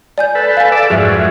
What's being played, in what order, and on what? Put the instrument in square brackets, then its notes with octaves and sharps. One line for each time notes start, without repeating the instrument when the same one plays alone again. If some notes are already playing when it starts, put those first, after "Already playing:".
[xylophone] D5 G#5 G6
[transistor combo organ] A4 B4
[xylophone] F5 G#5
[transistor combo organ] A4 D5 E5
[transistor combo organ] F2 G#2 F#3 [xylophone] G#4 E5